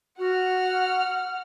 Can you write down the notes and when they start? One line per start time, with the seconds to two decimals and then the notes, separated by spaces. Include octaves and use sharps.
0.19 F#4 F#5 F6